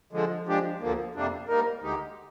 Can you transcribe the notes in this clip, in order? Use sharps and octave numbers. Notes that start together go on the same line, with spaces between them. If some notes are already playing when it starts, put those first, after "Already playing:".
D3 F3 G#3
F3 G#3 D4 G4
D2 D3 F3 A#3
F2 C3 G3 A#3 D4
G#2 G3 A#3 D#4 A#4
D2 D3 G#3 D#4 G4